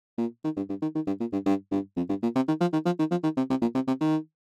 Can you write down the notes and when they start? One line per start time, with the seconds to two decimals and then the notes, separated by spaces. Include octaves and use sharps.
0.18 A#2
0.44 D#3
0.57 G2
0.69 G2
0.82 D#3
0.95 D#3
1.07 G2
1.20 A#2
1.33 G2
1.46 G2
1.71 G2
1.97 F2
2.09 G2
2.23 A#2
2.35 C3
2.48 D#3
2.61 F3
2.73 D#3
2.85 F3
2.99 D#3
3.11 F3
3.23 D#3
3.37 C3
3.50 C3
3.62 A#2
3.75 C3
3.87 C3
4.01 D#3